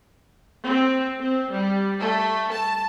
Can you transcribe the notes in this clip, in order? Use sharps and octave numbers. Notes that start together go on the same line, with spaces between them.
C4
C4
G3
A3
A5